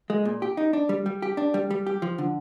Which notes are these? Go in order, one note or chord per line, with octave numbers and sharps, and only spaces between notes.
G#3
A#2
G4
D#4
D4
G3
G3
G4
D4
G3
G3
G4
F3
D3